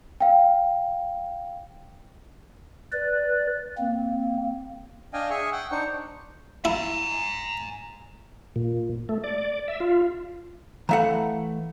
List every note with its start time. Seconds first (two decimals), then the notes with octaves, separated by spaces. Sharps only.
0.21 F5 G5
2.92 B4 D5
3.78 A#3 C4
5.13 D4 D#5 F5 G5 G#5
5.30 G#4 E5 G#5 C#6
5.52 F#5 G5
5.71 D4 D#4 C5 C#6
6.65 E4 G#5 A#5
8.56 A#2
9.09 A3
9.24 D5
9.68 E5
9.80 F4
10.89 E3 A3 F5 F#5 A#5